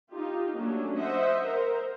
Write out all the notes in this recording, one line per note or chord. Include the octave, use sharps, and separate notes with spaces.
D#4 F4 G4
F#3 A3 A#3 C#4 D4
C5 D#5 E5 F#5
A#4 C5